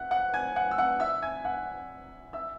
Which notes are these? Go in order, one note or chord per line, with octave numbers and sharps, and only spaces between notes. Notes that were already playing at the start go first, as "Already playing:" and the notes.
Already playing: E5 F#5 F#6
F#5 F#6
G#5 G#6
F#5 F#6
E6
F#5 F#6
E5 E6
G#5 G#6
F#5 F#6
E5 E6